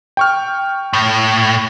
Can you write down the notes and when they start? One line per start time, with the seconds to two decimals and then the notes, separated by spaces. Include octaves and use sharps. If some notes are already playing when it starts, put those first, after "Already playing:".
0.17 G5 C#6 F6
0.93 A2